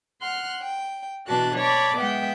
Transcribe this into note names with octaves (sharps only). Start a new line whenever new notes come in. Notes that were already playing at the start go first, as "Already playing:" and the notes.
F#5 C6 F6 F#6
G5
B2 E3 D4 F#4 A5 F#6
C#5 D5 A5 B5 D6
G#3 B3 E5 F#5 G5